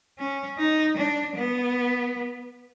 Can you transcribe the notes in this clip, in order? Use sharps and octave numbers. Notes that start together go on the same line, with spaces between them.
C#4
D#4
D4
B3